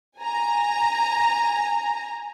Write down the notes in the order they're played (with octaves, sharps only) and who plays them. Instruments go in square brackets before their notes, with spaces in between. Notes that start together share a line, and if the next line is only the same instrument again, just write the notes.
[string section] G#5 A#5